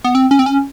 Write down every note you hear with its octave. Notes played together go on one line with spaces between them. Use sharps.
B3
C4
C#4
C4
C#4